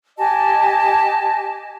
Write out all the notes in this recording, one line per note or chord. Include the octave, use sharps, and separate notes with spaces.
G4 D#5 G#5 A5